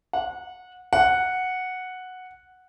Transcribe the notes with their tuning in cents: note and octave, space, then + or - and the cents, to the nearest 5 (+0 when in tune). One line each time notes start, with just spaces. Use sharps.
F#5 -20
F#5 -5